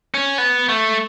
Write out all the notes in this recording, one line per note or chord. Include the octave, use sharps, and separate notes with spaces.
C#4
B3
A3